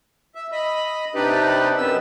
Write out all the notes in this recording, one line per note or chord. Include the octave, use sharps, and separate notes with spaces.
E5
D#5 B5
C3 D4 D#4 G4 B4
F#2 B3 E6